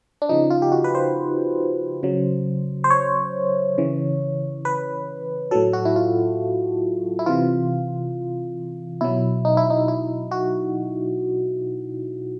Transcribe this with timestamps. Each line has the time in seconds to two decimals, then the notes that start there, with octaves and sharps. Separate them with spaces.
0.22 D4
0.29 C#3 F3 D#4
0.50 F4
0.62 G4
0.72 F#4
0.84 B4
0.95 C5
2.03 C#3 F#3
2.84 C5
2.90 C#5
3.78 C#3 E3
4.65 B4
5.51 A2 F#3 A4
5.73 F#4
5.85 E4
5.96 F4
7.19 E4
7.26 C3 E3 F4
9.01 B2 F#3 E4
9.45 D#4
9.57 E4
9.70 D#4
9.88 E4
10.31 F#4